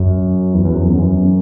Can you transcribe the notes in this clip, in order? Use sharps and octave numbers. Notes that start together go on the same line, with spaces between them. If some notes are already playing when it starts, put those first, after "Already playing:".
Already playing: F#2
E2
E2
F#2
E2
F#2